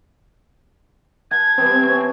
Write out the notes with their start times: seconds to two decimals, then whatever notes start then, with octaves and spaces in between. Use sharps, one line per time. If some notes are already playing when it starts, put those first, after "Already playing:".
1.31 F#5 A5 G#6
1.58 E3 G3 B3 C4
1.83 C#4